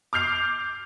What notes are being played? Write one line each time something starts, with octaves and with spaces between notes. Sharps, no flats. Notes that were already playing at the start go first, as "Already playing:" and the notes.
D6 F6 G6 C7 F7